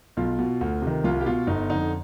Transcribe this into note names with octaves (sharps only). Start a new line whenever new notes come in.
B1 F4
B2
D2
C3 D#3
C2 F4
G4
B2 F4
G1 D#4
F2 D3 D#4